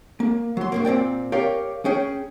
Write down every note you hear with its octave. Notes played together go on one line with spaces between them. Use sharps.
A#3
F#3 C6
G2 B2 A#3
A#2 C4 D5 G5
G4 A#4 C#5 D5 F5 G5
C#4 G#4 G5